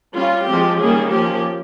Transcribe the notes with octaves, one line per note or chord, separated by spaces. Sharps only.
G3 C#4 F4
F3 G#3 C4 G4
D#3 G3 A#3 C#4 G#4
F3 A#3 C#4 G4